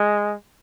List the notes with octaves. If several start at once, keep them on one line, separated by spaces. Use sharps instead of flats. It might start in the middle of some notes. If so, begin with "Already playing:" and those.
Already playing: G#3